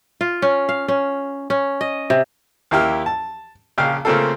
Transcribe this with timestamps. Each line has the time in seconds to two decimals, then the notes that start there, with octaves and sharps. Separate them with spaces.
0.21 F4
0.42 C#4
0.69 F5
0.88 C#4
1.50 C#4
1.81 D#5
2.10 C3
2.71 D#2 A#3 E4 G4 F6
3.06 A5
3.78 A#1 C#3 F5 G5 F6
4.05 C#3 A3 A#3 C4 F4 A4